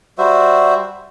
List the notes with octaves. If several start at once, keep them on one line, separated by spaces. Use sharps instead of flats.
G3 F#4 C5 E5